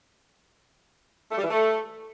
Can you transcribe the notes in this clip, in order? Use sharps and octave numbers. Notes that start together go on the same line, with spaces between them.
A3
G3
E3
A3